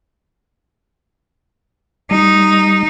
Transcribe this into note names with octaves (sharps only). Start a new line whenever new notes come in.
G3 D#4